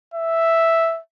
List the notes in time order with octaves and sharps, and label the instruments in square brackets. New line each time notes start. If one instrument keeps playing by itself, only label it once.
[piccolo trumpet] E5